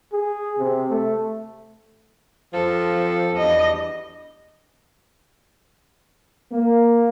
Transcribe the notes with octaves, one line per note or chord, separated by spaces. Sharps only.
G#4
C3
A3
F2 F3 A4
E2 G3 D4 D#5
A#3